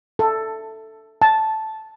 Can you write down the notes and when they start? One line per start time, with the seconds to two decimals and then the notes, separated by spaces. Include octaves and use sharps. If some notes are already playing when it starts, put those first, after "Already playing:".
0.19 A4
1.22 A5